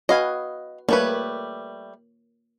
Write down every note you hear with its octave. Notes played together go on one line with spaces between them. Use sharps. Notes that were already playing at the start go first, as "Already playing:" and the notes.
F#4 B4 D#5 F5 G#5
G3 A3 A#3 B4 C#5